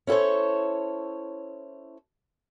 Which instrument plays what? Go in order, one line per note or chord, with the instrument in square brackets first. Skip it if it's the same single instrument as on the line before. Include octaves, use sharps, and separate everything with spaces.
[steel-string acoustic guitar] C#4 E4 A4 C5 C#5